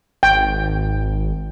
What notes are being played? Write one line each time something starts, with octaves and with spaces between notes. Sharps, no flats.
G#1 G5